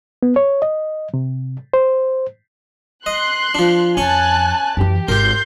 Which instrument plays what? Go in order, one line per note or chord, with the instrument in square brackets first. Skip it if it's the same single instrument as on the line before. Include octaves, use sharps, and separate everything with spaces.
[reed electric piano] B3
C#5
D#5
C3
C5
[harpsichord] D#5 [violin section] C6 F#6
[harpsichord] F3 D4
[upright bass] F2 [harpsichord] C#4 C#6 [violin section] G#5 A5 F#6
[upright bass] F#2 E3 [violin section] G4
[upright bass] G#1 [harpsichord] G4 A#4 [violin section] C6 G6